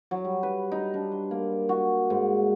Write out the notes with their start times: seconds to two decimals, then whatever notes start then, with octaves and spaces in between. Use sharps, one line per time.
0.11 F#3
0.25 G3
0.43 B4
0.72 D#4
0.94 D4
1.12 C6
1.31 A#3
1.69 F#4
2.10 G#2